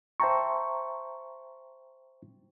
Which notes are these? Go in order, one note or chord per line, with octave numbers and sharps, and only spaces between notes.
C5 E5 G5 A5 A#5 C#6